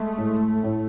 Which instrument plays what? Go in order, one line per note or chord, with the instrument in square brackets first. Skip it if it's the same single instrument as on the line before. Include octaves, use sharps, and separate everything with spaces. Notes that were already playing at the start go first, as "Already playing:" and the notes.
Already playing: [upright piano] G#3 [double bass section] A3
[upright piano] A2
A2